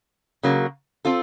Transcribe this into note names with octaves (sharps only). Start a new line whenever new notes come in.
C#3 F#3 A#3
C4 F4 A4